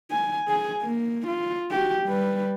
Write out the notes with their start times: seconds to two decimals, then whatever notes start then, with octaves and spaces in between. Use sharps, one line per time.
0.12 G#5
0.48 G#4 G#5
0.81 A#3
1.27 F4
1.71 F#4 G4
2.06 G3 B4